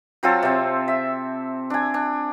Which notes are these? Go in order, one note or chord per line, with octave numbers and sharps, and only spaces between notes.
F#3 C4 F4 A4
C3 C4
E5
D4 G#5
D4